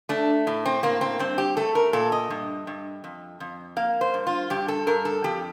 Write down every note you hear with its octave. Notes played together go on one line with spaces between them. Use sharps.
A3 D4
A2
C4
A#3 C4
C4
G2 C4
G4
A3 A4
A#4
A#2 A4
D#5
G2
G2
F2
F2
A#3 F5
C5
G2
F4
G2 G4
A4
G2 A#4
A4
F2 G4